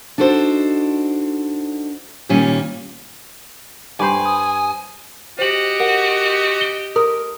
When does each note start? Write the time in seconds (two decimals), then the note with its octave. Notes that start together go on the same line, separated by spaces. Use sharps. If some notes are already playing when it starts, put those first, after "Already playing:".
0.18 D4 D#4 F#4 A4 C5
2.29 A#2 D#3 G3 C#4 G#5
4.00 G2 C5 G#5 B5 D6
4.26 D#6
5.39 F#4 G4 C5 D#5 F#7
5.80 A#4 F#5
6.61 G7
6.96 A#4 D#6